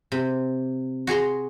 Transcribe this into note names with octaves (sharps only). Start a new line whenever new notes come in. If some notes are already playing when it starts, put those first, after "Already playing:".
C3
F#4 G#4 A#5 C6